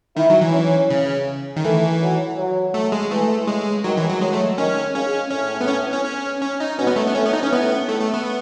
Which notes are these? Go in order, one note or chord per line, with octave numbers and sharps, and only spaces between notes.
D#3 E4
F#3
E3
C#4
C#3
D#3
E3 A3
F#3
F#3
A3
G#3
E3 A3
C#3 G#3
D#3 F#3
E3
F#3
F#3 G#3
A3
D#3 C#4
C#3 C#4
A2 C#4
B3
C#4
C#4
C#4
C#4
D#4
B2 C#4
B3
A3
B3
A2 C#4
B3
D#4
C#4
A2 B3
A3
A3
B3